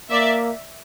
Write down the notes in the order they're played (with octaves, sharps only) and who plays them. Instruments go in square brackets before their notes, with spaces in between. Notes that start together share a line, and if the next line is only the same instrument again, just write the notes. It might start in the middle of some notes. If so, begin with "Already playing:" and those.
[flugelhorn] A#3 [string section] D5 E5